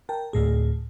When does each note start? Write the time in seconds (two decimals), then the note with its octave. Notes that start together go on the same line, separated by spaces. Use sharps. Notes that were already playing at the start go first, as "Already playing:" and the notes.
0.09 A#4 G5 A5
0.33 D2 A2 G#4